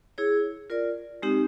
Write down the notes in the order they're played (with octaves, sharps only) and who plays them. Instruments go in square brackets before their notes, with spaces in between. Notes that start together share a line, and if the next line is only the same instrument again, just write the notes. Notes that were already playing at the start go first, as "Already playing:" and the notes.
[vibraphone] E4 G#4 C#5
F4 A#4 D5
G#3 C4 D#4 G4